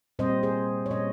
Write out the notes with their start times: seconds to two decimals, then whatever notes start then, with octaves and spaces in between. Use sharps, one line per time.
0.19 A#2 G3 C4 C5 D#5
0.43 G#4 C5
0.86 C#5
0.90 A#2 G3 C#4 C5 D#5